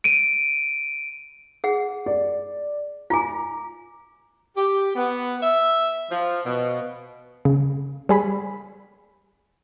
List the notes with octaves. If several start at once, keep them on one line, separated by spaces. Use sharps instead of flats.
D7 D#7
G#4 F#5
D5
F4 G#5 A#5 D6
G4
B3
E5
F3
B2
C#3
G3 G#4 B5 B6